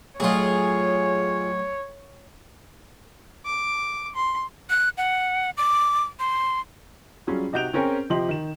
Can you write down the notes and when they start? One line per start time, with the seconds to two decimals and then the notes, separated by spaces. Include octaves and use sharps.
0.20 A2 F#3 D#4 F4 G#4 C#5
3.45 D6
4.15 C6
4.70 F#6
4.98 F#5
5.57 D6
6.19 C6
7.27 F#3 G3 C#4 F4 G#4
7.53 C3 D#4 F#4 G6 D7 F7
7.73 C4 C#4 G#4 A#4 C#5 G5
8.10 C3 F3 G4 D#5 C6 F#7
8.29 D#3 E7